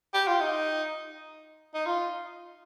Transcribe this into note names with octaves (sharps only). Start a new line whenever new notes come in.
G4
F4
D#4
D#4
F4